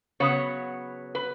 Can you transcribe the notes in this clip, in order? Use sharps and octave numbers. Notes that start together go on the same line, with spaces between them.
C#3 F#3 B3 C#5
B4